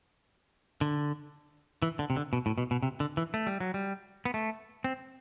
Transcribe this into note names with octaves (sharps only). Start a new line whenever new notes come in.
D3
E3
D3
C3
D3
B2
A2
B2
B2
C3
D3
E3
A3
G3
F#3
G3
B3
A3
C4